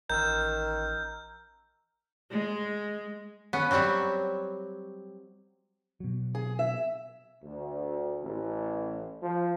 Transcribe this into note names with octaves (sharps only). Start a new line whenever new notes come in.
A1 D#3 A#5 E6 F6 G6
G#3
B3 C#4
F#3 G3 C4 C#5 E5
B2 F#3
G#4
E5
D2
A1
F3